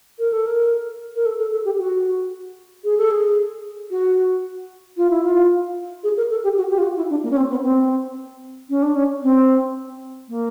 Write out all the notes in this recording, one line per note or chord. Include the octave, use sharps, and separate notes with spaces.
A#4
A4
A#4
A#4
A4
A4
A4
G4
F#4
G#4
A4
G#4
F#4
F4
E4
F4
G#4
A#4
A4
G4
F#4
G4
F4
F#4
E4
D4
A#3
C#4
C4
B3
C4
C#4
D4
C#4
C4
A#3